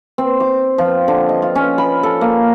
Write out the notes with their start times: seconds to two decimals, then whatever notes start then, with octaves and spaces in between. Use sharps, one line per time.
0.18 C4
0.40 D6
0.78 F3
1.08 D3
1.29 D#5
1.42 F4
1.55 C#4
1.78 B5
2.03 A4
2.21 A#3